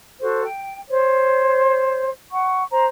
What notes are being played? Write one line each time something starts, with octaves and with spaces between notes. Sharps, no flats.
F#4 A4 C5
G5
C5 C#5
F#5 C#6
C5 A#5